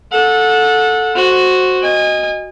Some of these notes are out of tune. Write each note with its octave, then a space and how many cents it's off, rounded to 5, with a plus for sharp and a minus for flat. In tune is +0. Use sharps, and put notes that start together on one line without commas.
A4 -5 F#5 -25
F#4 +0 C5 +15
D#5 +0 G#5 -30